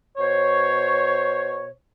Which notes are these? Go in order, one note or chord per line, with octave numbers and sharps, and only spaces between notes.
B2 C5 C#5